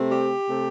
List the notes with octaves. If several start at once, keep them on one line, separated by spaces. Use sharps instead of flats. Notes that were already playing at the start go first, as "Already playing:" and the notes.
Already playing: C3 A3 C4
G4
C3 A3 C4